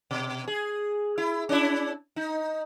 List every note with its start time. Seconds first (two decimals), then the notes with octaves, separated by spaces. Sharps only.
0.11 B2
0.48 G#4
1.18 E4
1.49 C#4 D4 E4
2.16 D#4